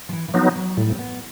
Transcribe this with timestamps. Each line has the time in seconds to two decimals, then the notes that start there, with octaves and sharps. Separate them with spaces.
0.09 F3
0.13 E3
0.28 E3
0.34 F3 F#3 B3 D#4
0.56 F#3
0.77 A2 G3
0.90 C4
0.99 B3